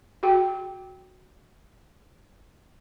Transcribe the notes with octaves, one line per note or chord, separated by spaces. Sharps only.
F#4 G#4 G5